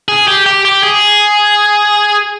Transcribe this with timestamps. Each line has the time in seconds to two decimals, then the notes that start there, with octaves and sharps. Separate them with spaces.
0.09 G#4
0.28 G4
0.46 G4
0.65 G4
0.83 G#4